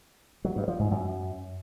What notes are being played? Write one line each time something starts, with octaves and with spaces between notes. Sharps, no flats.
F#3
G2
F3
G#2
F#2